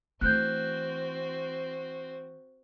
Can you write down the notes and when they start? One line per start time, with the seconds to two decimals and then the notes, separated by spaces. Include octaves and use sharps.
0.21 E3 A3 C4 F#4 F#6 G6